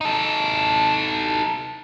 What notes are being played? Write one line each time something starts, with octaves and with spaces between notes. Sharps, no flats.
D#4 A4